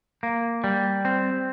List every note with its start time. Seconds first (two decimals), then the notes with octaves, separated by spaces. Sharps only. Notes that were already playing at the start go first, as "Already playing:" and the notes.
0.23 A#3
0.64 G3
1.05 C4